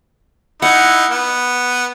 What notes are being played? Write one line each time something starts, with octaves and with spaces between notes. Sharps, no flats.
D#4 E4 F#5
B3